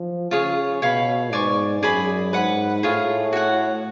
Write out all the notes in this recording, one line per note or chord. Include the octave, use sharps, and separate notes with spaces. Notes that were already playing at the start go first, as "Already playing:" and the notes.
Already playing: F3
C#3 F4 G#4 C#5
B2 C#5 F5 B5
G#2 D5 G#5 C#6
F#2 G#4 D5 G#5 B5
G#2 B4 F#5 B5
A2 F4 G#4 C#5
F#4 C#5 F#5